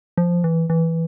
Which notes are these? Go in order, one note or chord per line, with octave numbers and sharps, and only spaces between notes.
F3
E3
E3